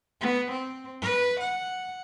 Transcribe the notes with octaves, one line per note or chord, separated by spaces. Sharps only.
B3
C4
B4
F#5